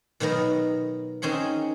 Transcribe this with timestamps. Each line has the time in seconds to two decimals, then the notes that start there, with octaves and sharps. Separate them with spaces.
0.20 B2 D#3 F#3 B3 A#4
1.22 D#3 C4 C#4 G#4 F#5